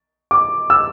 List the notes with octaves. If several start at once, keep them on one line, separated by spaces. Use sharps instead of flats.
D6
E6